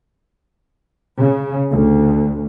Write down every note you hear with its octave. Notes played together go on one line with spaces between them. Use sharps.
C#3
D2